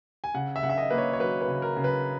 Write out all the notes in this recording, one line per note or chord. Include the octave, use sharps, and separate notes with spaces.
G#5
C#3 F#5
E5
C#3 F#5
E5
D#5
A#3 B4
C#5
C#5
F#3 B4
B4
C#3
A#4
C#3
B4